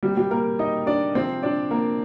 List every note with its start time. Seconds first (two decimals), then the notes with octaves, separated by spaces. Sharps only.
0.03 C3 G3 A#3 G4
0.17 G3 G4
0.30 A#3 A#4
0.59 D#4 D#5
0.87 D4 D5
1.15 C3 F3 G#3 C4 C5
1.43 D4 D5
1.71 A#3 A#4